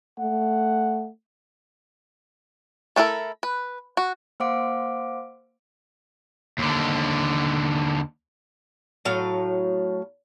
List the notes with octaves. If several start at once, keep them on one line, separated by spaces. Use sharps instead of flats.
A3 F#5
A3 D4 E4 A4 A#4
B4
F#4
A#3 C5 F5 F#5 D6 D7
D#2 D3
A2 F#3 F5